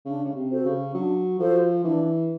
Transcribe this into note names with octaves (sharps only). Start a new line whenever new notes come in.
C#3 D4
C#3
C3
F#4 A4 C5
C#3
F#3 D4
F3 F#4 A4 C5
E3 D4